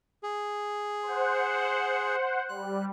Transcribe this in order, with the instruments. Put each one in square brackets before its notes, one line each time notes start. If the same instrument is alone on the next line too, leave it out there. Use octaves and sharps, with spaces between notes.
[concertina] G#4
[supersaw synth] C5 F#5
[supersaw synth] G3 [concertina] F#6